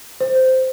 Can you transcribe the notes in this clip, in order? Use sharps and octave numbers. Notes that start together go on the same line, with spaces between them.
C5